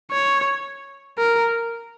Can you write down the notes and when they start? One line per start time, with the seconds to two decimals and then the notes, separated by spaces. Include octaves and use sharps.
0.11 C#5
1.18 A#4